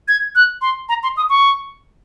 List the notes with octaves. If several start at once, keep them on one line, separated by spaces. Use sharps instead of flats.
G#6
F#6
C6
A#5
C6
D#6
C#6